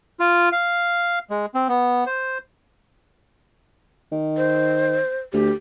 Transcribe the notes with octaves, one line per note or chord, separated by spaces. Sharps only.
F4
F5
G#3
C4
B3
C5
D#3
C5
D2 G4